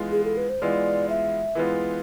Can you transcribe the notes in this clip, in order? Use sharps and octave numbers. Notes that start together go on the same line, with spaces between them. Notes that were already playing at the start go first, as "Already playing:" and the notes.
Already playing: E3 G#3 B3 F4
G#4
A4
B4
C5
E3 G#3 B3 F4 D5
E5
E3 G#3 B3 F4